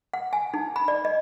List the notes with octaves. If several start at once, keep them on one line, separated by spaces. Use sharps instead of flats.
F#5
G#5
D#4
B5
D5
D#5